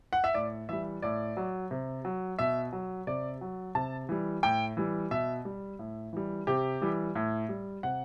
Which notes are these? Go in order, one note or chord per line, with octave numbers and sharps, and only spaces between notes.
F#5
E5
A2 D5
E3 G3 E5
A2 D5
F#3
C3
F#3
B2 E5
F#3
C3 D5
F#3
C3 A5
E3 G3
A2 G5
E3 G3
B2 E5
G3
A2
E3 G3
C3 G4
E3 G3
A2
G3
C3 F#5